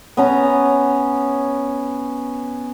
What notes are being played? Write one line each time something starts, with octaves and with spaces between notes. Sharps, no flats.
B3 C#4 A#5